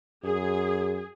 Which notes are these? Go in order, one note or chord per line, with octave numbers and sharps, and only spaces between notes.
F#2 G#4